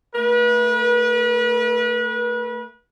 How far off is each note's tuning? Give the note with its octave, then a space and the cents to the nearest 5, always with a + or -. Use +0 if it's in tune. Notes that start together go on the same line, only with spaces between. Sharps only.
A3 +20 B4 -35